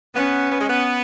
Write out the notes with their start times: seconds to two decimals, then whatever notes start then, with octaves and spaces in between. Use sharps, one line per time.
0.15 B3 C#4
0.50 B3
0.60 G#3
0.68 B3